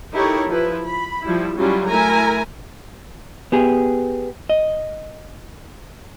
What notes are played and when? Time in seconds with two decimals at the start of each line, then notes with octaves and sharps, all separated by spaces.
0.12 D#4 E4 G4 A4 A#4 C#5
0.50 F3 E4 B4
0.86 B5
1.23 F3 G3 E4
1.57 F#3 G3 C#4 E4 F4
1.87 A3 E4 A#4 G#5 A#5
3.52 B3 G4 G#4
4.50 D#5